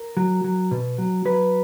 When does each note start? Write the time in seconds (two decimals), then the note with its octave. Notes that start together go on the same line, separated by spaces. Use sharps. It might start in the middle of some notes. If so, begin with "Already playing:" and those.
Already playing: A#4
0.17 F#3
0.44 F#3
0.71 B2
0.98 F#3
1.25 F#3 B4